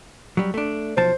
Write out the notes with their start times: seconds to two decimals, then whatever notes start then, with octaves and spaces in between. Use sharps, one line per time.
0.37 F#3 G3
0.54 A3 D4
0.97 B1 F3 C5 A5